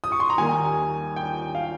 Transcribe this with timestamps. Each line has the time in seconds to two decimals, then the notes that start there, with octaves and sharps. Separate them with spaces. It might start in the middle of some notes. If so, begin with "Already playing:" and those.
0.04 D#6
0.12 C#6
0.20 C6
0.30 A#5
0.37 D#2 D#3 G3 A#3 G#5
1.16 G5
1.55 F5